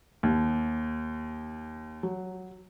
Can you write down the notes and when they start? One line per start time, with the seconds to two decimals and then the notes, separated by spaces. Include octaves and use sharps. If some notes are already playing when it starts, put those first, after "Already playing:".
0.23 D#2
2.03 F#3